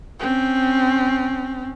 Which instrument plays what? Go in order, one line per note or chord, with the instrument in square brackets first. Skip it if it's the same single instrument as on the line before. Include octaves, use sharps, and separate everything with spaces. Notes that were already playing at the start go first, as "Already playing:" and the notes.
[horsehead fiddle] C4 C#4